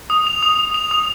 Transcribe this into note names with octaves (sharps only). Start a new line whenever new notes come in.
D#6
F7
D#6
D#6
F7
D#6